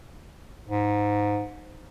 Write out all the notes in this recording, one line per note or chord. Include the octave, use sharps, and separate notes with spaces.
G#2